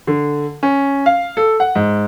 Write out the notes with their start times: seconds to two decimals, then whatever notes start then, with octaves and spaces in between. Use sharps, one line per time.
0.07 D3
0.63 C#4
1.06 F5
1.37 A4
1.60 F#5
1.75 G#2